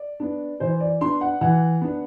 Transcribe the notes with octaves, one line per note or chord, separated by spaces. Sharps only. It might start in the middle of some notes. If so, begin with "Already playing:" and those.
Already playing: D5
B3 D4
E3 C5
D5
B3 D4 C6
F#5
E3 F#5
B3 D4